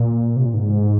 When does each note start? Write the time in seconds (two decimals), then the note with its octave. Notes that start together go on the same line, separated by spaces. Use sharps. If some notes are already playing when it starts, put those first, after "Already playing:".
Already playing: A#2
0.36 C3
0.46 A#2
0.54 G#2